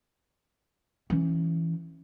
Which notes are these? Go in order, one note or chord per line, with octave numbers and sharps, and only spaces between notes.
E3 C#4